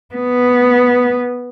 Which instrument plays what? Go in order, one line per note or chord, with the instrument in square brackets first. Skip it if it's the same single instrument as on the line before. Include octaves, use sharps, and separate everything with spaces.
[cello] B3